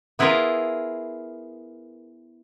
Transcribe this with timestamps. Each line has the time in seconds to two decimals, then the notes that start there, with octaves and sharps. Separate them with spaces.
0.19 B3 E4 F4 G#4 A#4 B4